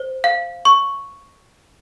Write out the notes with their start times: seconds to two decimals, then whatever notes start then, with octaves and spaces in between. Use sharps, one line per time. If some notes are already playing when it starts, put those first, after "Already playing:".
Already playing: C5
0.24 F5
0.65 C#6